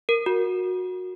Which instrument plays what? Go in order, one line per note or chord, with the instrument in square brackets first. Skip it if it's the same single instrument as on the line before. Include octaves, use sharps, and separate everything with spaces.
[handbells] A#4
F#4